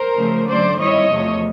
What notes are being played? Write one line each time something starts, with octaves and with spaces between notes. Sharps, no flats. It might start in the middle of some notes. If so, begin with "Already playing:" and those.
Already playing: A#4 C5
C#3 F3 A3 C#4
D3 F#3 A3 C5 D5
D#3 G3 C4 E4 C#5 D#5
E2 C3 F3 A3